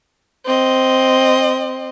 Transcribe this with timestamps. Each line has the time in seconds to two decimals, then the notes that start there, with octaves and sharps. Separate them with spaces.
0.45 C4 D#5